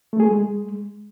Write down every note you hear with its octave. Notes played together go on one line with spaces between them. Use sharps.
A3
G#4
G#3